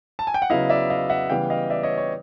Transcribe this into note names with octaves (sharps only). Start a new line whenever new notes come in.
A5
G#5
G5
F#5
C#3 F#3 B3 E4 D#5 F5
D5 E5
D#5 F5
E5 F#5
C#3 E3 G3 B3 F5 G5
D#5 F5
D5 E5
C#5 D#5
C#5